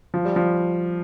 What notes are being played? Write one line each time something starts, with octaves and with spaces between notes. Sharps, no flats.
F3
G3
F3